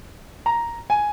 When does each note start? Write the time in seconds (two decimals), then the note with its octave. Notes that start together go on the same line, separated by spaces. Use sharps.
0.46 A#5
0.90 G#5